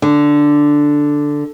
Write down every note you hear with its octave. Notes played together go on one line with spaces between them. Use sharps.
D3